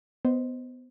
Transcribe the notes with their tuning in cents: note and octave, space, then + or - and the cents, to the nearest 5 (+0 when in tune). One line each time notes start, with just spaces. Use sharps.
B3 +20 C5 +0 D#5 +0